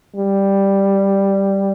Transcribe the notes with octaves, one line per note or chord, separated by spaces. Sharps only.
G3